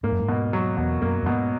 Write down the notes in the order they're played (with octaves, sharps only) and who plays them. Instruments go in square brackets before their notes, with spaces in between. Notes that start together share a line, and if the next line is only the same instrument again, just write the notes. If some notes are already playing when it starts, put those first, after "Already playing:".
[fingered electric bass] G#2 [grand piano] A#3
[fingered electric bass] F#2
G#2
[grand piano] B2
F#3
[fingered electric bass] E2 [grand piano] B2
[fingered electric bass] F#2 [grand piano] A#3
[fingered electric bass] F#2
[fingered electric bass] G#2 [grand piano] B2